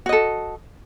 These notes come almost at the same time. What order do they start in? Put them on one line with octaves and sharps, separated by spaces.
F#4 D#5 A4